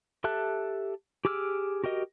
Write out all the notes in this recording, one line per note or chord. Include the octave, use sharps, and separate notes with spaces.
G4 A4 E5 A5 F#6
G4 G#4 D6 E6 F6
F#4 G4 A#4 D#5